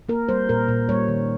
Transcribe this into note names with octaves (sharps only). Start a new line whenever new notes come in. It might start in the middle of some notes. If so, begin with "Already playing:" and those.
A#3 A#4
G3 C5
A#2 A#4
A#2
G3 C#5
D#3